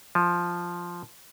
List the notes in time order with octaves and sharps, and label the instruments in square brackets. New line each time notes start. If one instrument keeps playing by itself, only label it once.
[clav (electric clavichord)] F3